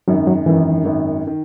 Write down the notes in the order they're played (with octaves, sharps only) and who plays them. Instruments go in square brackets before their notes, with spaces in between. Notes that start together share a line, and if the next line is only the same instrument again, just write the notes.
[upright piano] G#1 F#2 D#3 [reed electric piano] F#3
[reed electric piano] F#3
[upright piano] G#1 F#2 D#3 [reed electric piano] E3
[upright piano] G#1 F#2 D#3
D#3